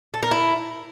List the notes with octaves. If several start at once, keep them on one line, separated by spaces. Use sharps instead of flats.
A4
A#4
E4